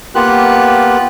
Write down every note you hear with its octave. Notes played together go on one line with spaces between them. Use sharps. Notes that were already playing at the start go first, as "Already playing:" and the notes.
A#3 B3 F4 G4 F#6